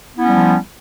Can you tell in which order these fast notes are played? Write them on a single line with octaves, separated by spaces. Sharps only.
B3 E4 C#4 G3 F3